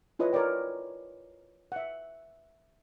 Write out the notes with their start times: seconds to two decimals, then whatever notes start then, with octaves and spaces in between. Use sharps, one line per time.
0.19 E4 F4 B4 C#5 D#5 D#6
0.33 A#4 C#5 D5 G5
1.72 E5 F#5